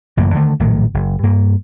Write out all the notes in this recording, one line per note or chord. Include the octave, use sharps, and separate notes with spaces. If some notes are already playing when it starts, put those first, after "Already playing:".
A1 F#2 C#3 A#3
D3 D#3 A3
A#1 A2 D#3 F#3
F#1
G2 A#3